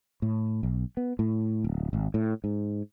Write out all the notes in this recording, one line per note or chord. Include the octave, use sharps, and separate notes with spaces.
A2
B1
B3
A2
D1
G#1
A2
G#2